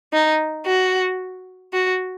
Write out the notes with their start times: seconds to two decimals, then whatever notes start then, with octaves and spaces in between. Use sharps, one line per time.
0.13 D#4
0.66 F#4
1.73 F#4